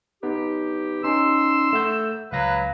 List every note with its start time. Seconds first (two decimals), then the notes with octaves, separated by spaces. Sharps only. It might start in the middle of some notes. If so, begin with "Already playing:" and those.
0.23 B3 D#4 G4 B4
1.04 C#4 D#4 C6 E6
1.73 A3 F#5 G6
2.32 C#2 F#3 B4 F5 A#6